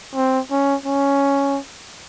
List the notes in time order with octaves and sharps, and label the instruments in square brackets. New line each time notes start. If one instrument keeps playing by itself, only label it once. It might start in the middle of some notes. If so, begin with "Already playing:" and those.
[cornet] C4
C#4
C#4